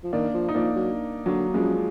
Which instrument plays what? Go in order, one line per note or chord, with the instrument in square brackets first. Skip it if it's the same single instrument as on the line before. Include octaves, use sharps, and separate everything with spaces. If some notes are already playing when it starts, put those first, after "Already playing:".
[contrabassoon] F3
[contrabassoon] D#3 [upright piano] A#3 D4
[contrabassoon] F3
[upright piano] D#4
[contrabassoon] F3 [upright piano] A#3 D4
[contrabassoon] F#3
[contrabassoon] D3 [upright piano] F#3 A#3
[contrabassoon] F#2 [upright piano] F3 G#3